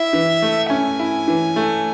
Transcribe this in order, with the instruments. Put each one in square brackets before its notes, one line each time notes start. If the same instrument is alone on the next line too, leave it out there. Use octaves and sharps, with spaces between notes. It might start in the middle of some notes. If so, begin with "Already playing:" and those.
Already playing: [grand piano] E4 [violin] E5
[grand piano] E3
A3
[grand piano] C#4 [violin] G#5
[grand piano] E4
E3
A3